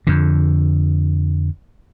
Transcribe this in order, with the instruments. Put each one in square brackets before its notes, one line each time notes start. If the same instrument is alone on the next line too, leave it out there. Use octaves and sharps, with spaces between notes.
[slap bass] F2 D3